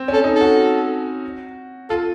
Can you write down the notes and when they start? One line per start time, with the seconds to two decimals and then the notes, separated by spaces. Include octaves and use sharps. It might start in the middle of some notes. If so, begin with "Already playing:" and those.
Already playing: C4
0.08 C#4 A4
0.24 D#4
0.36 A4
0.41 F#4
1.89 F4 A4